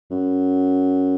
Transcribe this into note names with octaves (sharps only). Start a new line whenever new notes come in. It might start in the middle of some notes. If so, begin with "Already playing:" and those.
F#2